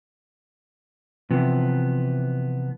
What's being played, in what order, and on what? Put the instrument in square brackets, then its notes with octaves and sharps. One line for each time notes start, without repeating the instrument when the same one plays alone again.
[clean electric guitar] C3 E3 F3 B3